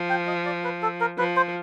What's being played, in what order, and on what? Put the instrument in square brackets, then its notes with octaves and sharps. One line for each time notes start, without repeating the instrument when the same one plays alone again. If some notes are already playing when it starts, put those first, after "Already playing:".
Already playing: [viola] F3
[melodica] G5
D#5
D5
B4
A4
A#4
[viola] F3 [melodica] B4
[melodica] C5